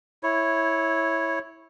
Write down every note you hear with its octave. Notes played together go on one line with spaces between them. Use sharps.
E4 C#5